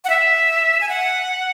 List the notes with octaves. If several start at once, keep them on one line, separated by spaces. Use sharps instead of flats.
F#5
E5
G#5
F#5